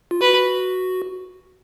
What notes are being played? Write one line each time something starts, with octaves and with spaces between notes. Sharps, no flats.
F4
F#4 B4